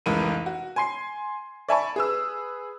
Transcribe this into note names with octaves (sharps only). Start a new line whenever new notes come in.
F1 C#2 E3 A#4 D#7
F#4
G#5 C6 C7
D5 E5 G#5 A5 B5 C#6
G#4 B4 E6